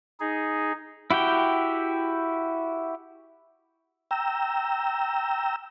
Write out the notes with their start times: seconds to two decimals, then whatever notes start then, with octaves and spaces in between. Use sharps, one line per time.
0.20 D#4 G#4
1.11 E4 F#4 G4 G5
4.11 G5 A#5 E6